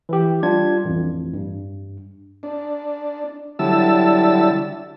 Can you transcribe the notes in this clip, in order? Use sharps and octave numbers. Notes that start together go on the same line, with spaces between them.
E3 G4
G3 D4 F4 G#6
A1 F2
G2
D4
D3 F#3 G3 E4 A5 E6